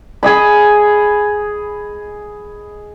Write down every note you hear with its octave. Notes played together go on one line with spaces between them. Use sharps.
G#4 D#5 B5